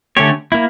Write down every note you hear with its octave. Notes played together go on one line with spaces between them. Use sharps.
D3 A3 C#4 G4 C#5
A#3 E4